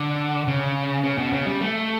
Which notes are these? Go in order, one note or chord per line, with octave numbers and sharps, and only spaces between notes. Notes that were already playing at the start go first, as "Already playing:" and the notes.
Already playing: D3
C#3
C#3
B2
C#3
G3
A3